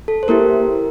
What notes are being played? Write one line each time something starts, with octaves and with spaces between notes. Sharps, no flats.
A4
C5
A#3 E4 G4 A#4